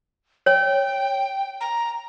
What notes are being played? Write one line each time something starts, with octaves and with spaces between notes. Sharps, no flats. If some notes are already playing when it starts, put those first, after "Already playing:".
C#5 G5
A#5